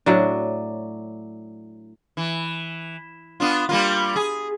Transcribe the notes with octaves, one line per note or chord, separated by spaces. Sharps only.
A2 F#3 D4
E3
B3 D4 F4
G3 A#3 F4
G#4